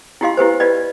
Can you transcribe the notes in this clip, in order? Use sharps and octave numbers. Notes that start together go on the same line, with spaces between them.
E4 F4 G4 D#5 F5 C6
E4 G4 B4 C5
F4 B4 D5 D#5